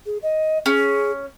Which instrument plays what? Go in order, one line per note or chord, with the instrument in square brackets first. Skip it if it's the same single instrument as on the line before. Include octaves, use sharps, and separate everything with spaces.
[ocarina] G#4
D#5
[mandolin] C#4 [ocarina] G#4